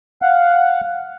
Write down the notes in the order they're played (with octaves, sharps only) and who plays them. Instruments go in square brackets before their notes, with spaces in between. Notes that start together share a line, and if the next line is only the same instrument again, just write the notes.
[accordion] F5 F#5